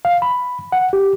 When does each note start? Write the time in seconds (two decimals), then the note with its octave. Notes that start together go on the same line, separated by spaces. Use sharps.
0.05 F5
0.22 B5
0.72 F#5
0.93 G4